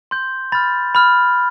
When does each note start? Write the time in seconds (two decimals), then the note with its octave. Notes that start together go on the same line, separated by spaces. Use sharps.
0.11 C6 G6
0.52 B5 F6 A6
0.95 B5 F6